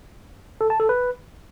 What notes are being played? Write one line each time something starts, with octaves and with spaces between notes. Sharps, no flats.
A4
A5
A4
B4